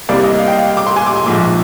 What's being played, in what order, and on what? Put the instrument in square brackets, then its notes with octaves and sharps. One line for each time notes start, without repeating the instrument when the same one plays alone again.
[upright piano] C2 C3 G3 A#3 D5
D#5
F5
G5
F5
D6
C6
G#5
D6
C6
A#1 G#2 F3 D6